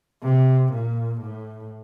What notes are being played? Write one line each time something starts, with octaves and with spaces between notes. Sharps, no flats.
C3
A#2
A2